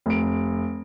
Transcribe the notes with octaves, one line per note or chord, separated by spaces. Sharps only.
F1 D7